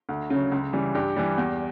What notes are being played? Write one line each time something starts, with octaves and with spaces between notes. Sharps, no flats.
D2
C#3 F#3
C#2
C#3 E3 G3
G2 G4
E3 G3
E2